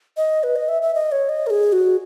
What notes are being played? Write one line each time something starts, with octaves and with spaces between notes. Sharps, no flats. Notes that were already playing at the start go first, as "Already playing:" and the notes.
D#5
B4
D#5
E5
E5
D#5
C#5
D#5
A#4
G#4
F#4